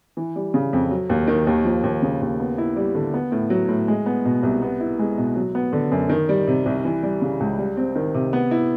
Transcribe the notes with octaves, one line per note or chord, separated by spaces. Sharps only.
E3
G3
C#3
F2
F#3
D#2
D#3
D#2
F3
D#2
C#3
D#2
B3
E4
G3
D3
B3
A2
F#3
A2
G#3
B3
B2
C2
B3
E4
G#3
B2
F#3
B3
D3
F#2
D#3
G3
C3
C2
E3
G3
C#3
C#2
G3
C4
D#3
C3
B3
E4